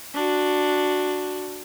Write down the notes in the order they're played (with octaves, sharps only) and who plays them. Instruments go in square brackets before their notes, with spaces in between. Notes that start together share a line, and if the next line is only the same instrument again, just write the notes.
[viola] D4 F#4